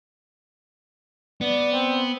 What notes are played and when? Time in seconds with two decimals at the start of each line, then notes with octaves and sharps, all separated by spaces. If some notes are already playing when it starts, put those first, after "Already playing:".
1.41 B3 D5
1.72 C4